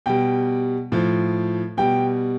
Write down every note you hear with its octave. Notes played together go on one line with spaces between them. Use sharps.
B2 G3 G5
A2 F3
B2 G3 G5